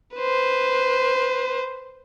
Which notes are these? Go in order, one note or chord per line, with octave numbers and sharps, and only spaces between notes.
B4 C5